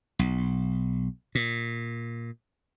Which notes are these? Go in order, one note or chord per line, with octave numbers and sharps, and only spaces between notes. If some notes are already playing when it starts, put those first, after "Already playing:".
B1
A#2